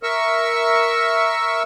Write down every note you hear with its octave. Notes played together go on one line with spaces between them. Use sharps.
A#4 E5 C#6 E6